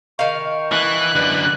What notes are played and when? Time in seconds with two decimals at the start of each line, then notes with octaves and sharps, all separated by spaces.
0.19 D#3 F5 C#6
0.72 E3 F#6
1.15 F#2 D3 B4